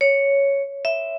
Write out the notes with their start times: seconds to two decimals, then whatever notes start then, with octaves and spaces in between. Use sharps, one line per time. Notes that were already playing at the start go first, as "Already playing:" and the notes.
0.01 C#5
0.85 E5